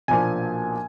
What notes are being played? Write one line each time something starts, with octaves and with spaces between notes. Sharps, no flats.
B1 A#2 F3 A#3 D4 G#5